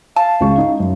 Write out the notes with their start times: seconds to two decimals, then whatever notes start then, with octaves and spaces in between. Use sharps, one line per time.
0.16 F5 A5
0.40 C#2 C#3 C#6
0.58 D#4
0.80 F#2